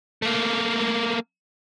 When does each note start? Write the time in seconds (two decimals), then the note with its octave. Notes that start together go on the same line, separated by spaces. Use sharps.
0.22 A3 A#3